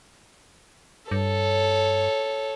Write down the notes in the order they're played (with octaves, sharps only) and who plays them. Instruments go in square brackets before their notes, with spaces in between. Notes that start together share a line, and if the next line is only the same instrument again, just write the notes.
[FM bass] G2 [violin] A4 C#5